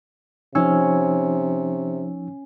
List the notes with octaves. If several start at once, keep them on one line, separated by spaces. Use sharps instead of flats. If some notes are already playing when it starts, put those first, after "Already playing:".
C3 F3 C#4 D#4 E6